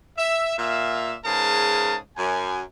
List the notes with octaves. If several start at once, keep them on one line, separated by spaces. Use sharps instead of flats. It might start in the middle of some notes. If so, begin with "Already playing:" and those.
E5
A#2 E5 F5
G#2 C#3 G#4 A#4 B4 A5
F#2 G#5